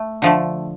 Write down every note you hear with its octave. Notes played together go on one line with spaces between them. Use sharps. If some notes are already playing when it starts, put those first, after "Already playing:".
Already playing: A3
D3 F3 A3